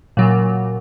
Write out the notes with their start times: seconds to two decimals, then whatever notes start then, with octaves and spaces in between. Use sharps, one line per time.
0.17 A#2 C#3 F#3